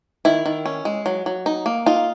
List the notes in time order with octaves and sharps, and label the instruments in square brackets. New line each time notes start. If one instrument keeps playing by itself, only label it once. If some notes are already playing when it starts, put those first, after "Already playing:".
[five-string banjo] D#3 E4
D#3
C#4
G#3
F#3
F#3
D#4
A#3
D#4 F4